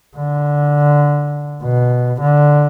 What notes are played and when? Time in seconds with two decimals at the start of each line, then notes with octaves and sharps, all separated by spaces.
0.17 D3
1.63 B2
2.21 D3